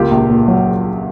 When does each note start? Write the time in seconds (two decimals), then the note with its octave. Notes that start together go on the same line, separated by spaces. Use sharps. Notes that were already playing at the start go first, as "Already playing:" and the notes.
Already playing: C#2 A#3 F4 G4
0.11 A#1
0.30 A#2
0.48 F#3